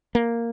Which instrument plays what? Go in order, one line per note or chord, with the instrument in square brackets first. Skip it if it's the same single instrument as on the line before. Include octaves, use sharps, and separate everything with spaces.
[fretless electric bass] A#3